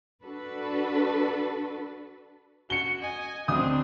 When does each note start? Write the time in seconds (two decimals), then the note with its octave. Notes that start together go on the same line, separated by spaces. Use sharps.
0.24 D4 F#4 A4 B4
2.70 F#4 C#7 G7
3.01 D#5 G#5
3.48 D2 C4 D4 D#6